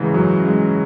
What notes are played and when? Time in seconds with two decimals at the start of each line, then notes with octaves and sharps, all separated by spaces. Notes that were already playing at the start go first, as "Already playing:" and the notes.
Already playing: G#2 C#3 E3
0.14 F#2 F#3
0.44 G#3